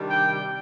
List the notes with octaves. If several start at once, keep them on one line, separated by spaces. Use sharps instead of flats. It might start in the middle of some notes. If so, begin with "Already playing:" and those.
Already playing: C3 D#3 G3 D4
G5